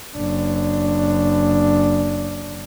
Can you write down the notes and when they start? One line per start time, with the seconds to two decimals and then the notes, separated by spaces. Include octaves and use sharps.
0.16 F#1 D4